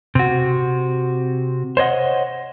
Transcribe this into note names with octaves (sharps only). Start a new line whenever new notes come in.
C3 F#4
C5 C#5 D#5 F#5